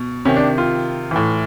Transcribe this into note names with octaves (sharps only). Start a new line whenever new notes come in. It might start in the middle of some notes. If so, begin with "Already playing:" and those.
Already playing: B2
C3 D#3 C#4
D4
F4
A2 E3